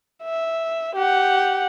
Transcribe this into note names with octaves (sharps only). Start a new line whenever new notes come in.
E5
G4 F#5